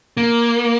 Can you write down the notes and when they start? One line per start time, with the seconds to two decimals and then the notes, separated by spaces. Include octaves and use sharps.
0.17 A#3